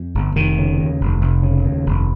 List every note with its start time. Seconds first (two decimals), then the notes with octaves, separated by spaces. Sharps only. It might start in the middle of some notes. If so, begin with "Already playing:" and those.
Already playing: F2
0.15 G1
0.36 F1 D#3
0.58 C#3
0.79 D#2
1.01 F1
1.21 F1
1.43 C#3
1.65 D#2
1.86 F1